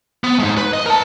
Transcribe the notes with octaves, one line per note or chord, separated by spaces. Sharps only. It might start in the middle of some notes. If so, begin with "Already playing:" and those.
B3
G#3 D#4
B4
D#5
A#4 A5